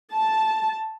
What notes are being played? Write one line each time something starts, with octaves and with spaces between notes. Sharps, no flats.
A5